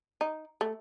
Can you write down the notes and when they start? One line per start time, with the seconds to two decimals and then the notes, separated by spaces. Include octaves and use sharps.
0.21 D#4
0.61 A3